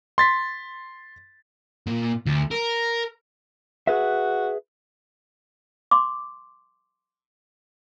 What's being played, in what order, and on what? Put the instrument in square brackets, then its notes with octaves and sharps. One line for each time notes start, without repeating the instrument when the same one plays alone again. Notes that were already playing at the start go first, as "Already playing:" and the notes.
[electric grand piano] C6 A6 B6
[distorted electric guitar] A#2
D2
A#4
[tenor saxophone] F#4 [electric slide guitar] G#4 B4 E5
[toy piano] C6 D6